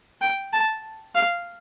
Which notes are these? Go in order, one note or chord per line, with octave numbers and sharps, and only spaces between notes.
G5
A5
F5